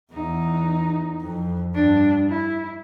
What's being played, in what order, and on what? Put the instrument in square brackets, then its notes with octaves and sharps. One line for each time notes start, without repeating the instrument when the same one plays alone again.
[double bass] E2 [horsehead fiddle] D#4
[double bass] F2
[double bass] G2 [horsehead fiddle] D4
[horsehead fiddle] E4